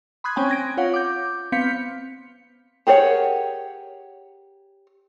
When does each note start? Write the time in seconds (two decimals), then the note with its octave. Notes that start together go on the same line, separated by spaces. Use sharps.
0.24 B5 C6 D#6 F#6 G#6
0.36 C4 C#4 G5 G#5
0.49 G#6 A#6 D7
0.77 F4 C#5 F5 F#5
0.94 D6 G6
1.52 B3 C4 F5 G6 B6 C#7
2.87 G4 G#4 A#4 C#5 F#5